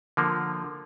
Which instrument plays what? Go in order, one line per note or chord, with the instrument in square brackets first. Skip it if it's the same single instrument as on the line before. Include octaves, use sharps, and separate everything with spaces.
[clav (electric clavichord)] D3 F3 A#3